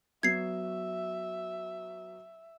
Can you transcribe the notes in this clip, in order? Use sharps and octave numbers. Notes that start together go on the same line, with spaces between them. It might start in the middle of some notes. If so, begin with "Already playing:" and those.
F#3 B3 F#4 E5 G#6 C7